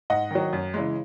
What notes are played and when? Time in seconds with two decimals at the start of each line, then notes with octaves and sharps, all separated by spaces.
0.10 G#2 D#5 F#5
0.31 D#3 F#3
0.53 F#2
0.74 C#3 E3 G#3